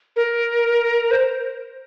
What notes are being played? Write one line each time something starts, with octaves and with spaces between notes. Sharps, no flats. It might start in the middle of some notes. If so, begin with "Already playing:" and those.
A#4
C5